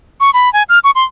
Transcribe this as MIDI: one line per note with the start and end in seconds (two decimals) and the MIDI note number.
0.20 0.30 85
0.34 0.52 83
0.53 0.63 80
0.69 0.79 89
0.84 0.91 85
0.95 1.04 84